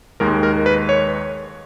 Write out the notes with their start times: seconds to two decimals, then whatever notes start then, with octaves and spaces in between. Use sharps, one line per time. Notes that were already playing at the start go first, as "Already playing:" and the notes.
0.20 D#2 D#3 G#3 A#4
0.43 A#4
0.66 B4
0.89 C#5